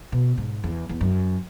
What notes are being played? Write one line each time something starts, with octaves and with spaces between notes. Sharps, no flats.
B2
G#2
E2
E2
F#2